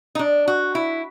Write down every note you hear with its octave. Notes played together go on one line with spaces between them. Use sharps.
D#4
D4
F#4
E4